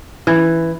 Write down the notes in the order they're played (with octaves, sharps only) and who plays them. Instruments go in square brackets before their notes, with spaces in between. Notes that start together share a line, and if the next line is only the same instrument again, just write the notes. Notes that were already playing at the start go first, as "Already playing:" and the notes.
[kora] E3